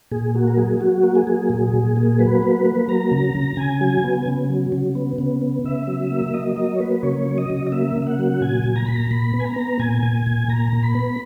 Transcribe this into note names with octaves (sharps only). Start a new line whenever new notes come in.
A#2 G#4
A#3 F#4
A#4
F#3 G#4
F#3 F#4
A#3
G#4
F#3
A#2
A#2
A#3
F#3 B4
A#3
A#3
F#3 A#5
C#3
C#3
C#3 G#5
F#3
B3
C#3
F#3
C#3
B3
C#3
B3
C#3 E5
F#3
A#3
F#3 D#5
F#3 D#5
C#5
A#3 B4
C#3 C#5
F#3
D#5
C#3
D#5
A#3 E5
C#3
E5
F#5
F#3
A#2 G#5
A#2
A#5
A#2 B5
A#5
A#2 B5
B3
G#5
A#5
B3
A#2 G#5
A#2
A#2
A#2 A#5
A#2
B5
B3